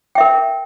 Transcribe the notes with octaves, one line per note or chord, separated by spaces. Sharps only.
A#4 E5 G5